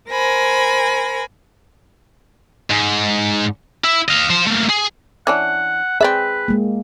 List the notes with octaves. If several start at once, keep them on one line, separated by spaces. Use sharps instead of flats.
A#4 C5 G#5 B5 A#6
G#2
E4
D#5 F5
F3 C5
A3 A#3
G#4
E3 C#4 D4 F#5
C4 G#4 B4 D5 E5
G#3 A#3